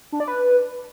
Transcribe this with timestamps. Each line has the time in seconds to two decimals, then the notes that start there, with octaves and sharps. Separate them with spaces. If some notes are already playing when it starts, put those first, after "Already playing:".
0.12 D4
0.20 D5
0.28 B4